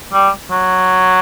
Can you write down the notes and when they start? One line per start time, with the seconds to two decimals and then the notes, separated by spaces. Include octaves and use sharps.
0.13 G3
0.50 F#3